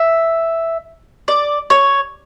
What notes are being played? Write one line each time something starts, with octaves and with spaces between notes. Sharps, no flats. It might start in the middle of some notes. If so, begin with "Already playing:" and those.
Already playing: E5
D5
C#5